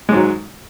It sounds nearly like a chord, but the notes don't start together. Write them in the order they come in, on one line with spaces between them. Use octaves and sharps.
G#3 G#2 F#3